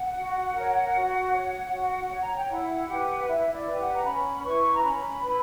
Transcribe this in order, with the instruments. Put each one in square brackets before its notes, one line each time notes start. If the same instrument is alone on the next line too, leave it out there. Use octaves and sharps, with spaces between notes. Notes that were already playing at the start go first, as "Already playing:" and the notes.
Already playing: [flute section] F#5
F#4
A#4 C#5
F#4
C#5
F#4
C#5
A#5
G5
E4 F#5
G4 B4
E4 E5
D5
G4 B4
F#5
A#5
C#4 B5
E4 B4 C#6
A#5
C#4 B5
E4 B4